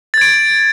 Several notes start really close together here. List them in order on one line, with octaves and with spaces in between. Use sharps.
A6 G#6 D7